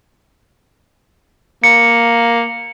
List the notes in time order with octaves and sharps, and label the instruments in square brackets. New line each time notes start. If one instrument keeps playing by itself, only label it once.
[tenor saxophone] A#3 [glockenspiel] C#7